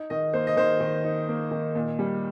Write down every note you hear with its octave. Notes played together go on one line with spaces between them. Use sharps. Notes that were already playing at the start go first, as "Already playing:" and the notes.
Already playing: D#4
D#3 D#5
A#3 C5
D#5
D#3 C5
D#3
D#4
A#3
D#3
A#2
G3